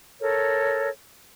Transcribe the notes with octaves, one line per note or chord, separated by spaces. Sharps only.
A4 A#4 C#5